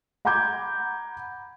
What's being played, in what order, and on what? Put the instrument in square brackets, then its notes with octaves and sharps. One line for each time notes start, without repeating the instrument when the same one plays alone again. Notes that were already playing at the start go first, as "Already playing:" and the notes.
[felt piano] F#5 A#5 B5 D6 G6 G#6